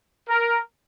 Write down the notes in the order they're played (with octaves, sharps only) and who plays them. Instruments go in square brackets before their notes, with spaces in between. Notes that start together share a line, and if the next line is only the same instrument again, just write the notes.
[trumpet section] A#4